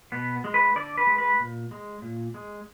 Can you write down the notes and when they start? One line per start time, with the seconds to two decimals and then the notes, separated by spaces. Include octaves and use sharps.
0.12 B2 B3
0.44 G#3
0.54 B4
0.76 D3 D5
0.97 B4
1.07 G#3
1.18 B4
1.40 A#2
1.71 G#3
2.02 A#2
2.34 G#3